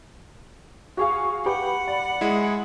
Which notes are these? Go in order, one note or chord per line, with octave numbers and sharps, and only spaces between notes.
F#4 G#4 F5 C#6
G4 B4 F#5 G5 B5
D5
G#3 E4 G#4